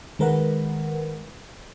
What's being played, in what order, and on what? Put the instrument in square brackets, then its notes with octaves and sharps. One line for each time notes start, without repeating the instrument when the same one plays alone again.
[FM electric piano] D#3 G#3 A#4 B4 F#5